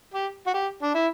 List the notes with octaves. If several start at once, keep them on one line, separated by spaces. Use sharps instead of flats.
G4
F#4
G4
D4
E4